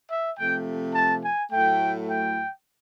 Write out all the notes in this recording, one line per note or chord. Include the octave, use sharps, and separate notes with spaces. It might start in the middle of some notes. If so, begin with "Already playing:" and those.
E5
C3 F3 A3 G5
A5
G#5
A2 F#3 A3 G5
G5